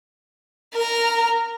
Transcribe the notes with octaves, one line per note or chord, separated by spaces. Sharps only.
A#4 A#5